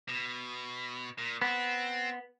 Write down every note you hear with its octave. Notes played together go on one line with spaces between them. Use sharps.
B2
A#2
B3 C4